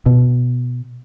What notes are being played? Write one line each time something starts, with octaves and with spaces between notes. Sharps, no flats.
B2